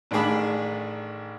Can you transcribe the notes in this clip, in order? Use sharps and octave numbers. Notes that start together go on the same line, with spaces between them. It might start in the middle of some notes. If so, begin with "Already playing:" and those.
A1 D#3 A3 D4 G#4 B5